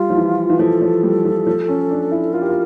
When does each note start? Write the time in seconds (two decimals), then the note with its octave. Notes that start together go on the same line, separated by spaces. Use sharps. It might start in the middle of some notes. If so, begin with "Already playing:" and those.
Already playing: G3 F4
0.10 F3
0.16 E3
0.50 E3
0.59 F3 A4
0.82 F3
1.03 G3
1.25 F3
1.47 F3
1.68 C#4
1.91 D4
2.11 E4
2.33 F4 A#4
2.42 G4
2.49 F4